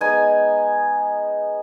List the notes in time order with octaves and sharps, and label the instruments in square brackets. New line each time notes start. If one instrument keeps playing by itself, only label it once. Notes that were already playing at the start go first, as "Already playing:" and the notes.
[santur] G#3 B3 D#4 G#5